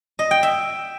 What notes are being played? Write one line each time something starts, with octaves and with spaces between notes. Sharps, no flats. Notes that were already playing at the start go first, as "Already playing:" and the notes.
D#5
G5
E5